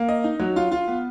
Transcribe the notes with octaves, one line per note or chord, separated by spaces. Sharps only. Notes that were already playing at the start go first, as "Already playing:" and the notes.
Already playing: A#3
D#5
D#4
F#3
F4
F4
B3